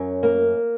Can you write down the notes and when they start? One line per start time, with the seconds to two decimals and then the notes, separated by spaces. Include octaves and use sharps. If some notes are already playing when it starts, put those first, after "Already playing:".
Already playing: F#2 C#4
0.23 A#3